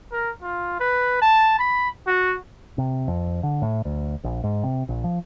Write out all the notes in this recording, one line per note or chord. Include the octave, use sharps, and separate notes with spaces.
A#4
F4
B4
A5
B5
F#4
C3
F2
D3
A2
D2
A#1
G#2
C3
A#1
F3